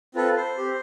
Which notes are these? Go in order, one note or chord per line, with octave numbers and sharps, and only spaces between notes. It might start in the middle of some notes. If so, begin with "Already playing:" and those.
C4 F4 A4 B4
C5
C4 G4